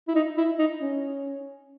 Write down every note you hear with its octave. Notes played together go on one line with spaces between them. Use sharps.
E4
D#4
E4
D#4
C#4